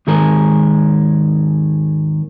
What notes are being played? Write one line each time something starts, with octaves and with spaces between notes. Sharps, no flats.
D#2 G#2 D#3 G#4 A#4